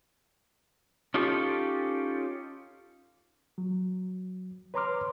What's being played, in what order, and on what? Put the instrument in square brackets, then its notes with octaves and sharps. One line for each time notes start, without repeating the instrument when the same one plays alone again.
[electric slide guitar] C#4 D#4 F4 G4 A4
[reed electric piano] F#3
B4 C#5 A#5 C6 D6 F6